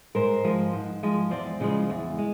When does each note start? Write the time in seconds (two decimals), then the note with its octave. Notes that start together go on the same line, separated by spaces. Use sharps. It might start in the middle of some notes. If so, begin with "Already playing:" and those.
0.15 G#2 A#4 C5
0.44 F3 G#3
0.73 G#2
1.03 F3 G#3
1.31 E2 C5 D5
1.60 C#3 F3 G#3
1.90 E2
2.18 G#3